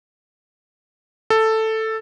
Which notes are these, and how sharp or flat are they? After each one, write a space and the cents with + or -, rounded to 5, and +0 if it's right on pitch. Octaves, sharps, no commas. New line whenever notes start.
A4 +5